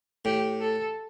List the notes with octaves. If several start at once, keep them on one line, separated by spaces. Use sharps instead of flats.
A2 G4
A4